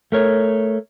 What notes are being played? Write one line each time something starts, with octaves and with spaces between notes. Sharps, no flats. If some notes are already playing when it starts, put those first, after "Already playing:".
A3 A#4 C#5